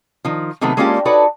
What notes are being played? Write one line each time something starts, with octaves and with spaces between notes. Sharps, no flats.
D#3 F3
C3 D#3 F#3 A3 B3
G#3 A#3 C#4 D4 F4 G4
D#4 F#4 A4 B4 C#5 D5